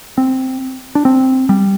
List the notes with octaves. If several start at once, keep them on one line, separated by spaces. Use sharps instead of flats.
C4
D4
C4
G3